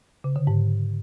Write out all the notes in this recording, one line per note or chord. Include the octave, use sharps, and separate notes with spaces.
C#3
D3
G#2